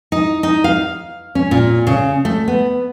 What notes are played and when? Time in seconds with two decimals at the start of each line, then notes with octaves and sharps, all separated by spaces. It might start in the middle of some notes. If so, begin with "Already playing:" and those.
0.12 D#4
0.43 D#4
0.64 F5
1.35 C#4
1.51 A#2
1.87 C#3
2.25 A3
2.48 B3